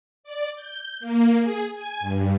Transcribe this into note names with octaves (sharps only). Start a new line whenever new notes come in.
D5
G6
A#3
G#4
G#5
G2